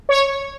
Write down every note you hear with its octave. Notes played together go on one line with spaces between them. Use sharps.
C#5